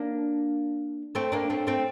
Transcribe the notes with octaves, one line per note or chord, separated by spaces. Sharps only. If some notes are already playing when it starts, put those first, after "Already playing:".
Already playing: A#3 D4
A3 C4
A#3 D4
A3 C4
A3 C4